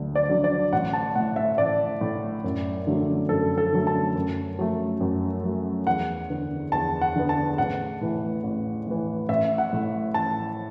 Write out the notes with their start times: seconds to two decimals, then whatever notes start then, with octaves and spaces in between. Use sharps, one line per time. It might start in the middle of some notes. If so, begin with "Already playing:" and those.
Already playing: D2 D3 F#3
0.15 D5
0.30 D3 F#3
0.44 D5
0.72 A1 F#5
0.93 A5
1.15 A2 A3 F#5
1.36 E5
1.58 A1 D5
2.01 A2 A3
2.44 F#2
2.87 D3 F#3 A3
3.29 F#2 A4
3.58 A4
3.72 D3 F#3 A3
3.87 A5
4.15 F#2
4.59 F#3 A3
5.01 F#2
5.44 F#3 A3
5.87 E2 F#5
6.30 D3 B3
6.72 E2 A5
7.01 F#5
7.16 D3 B3
7.29 A5
7.58 A1 F#5
8.01 A2 E3
8.44 A1
8.87 A2 E3
9.29 A1 E5
9.58 F#5
9.73 A2 A3
10.14 A1 A5